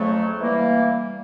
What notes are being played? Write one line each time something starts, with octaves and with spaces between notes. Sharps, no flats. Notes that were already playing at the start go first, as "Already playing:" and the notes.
Already playing: F2 C#3 F#3 A3
E3 G3 A#3